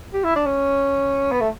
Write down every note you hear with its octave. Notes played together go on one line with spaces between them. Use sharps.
G4
E4
D4
C#4
B3
A3